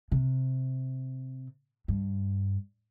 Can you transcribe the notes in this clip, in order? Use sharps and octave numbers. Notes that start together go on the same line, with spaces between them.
C3
G2